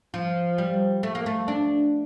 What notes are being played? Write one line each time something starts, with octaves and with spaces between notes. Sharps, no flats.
F3
G3
A3
A#3
A3
D4